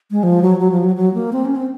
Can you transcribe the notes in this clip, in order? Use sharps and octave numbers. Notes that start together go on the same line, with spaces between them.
G#3
F3
F#3
F#3
F3
F#3
F#3
A#3
C4
C#4
C4